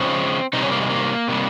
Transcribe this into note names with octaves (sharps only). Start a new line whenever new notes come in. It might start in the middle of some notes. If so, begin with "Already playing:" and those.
Already playing: C#3 F3 G#3 C4
C3 D#3 G3 D#4
C#4
A#3
G#3
A#3
C3 D#3 G3